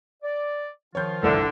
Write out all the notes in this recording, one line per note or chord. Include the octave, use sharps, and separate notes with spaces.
D5
D#3 F3 F4 C#5 G6
G1 C2 D3 E5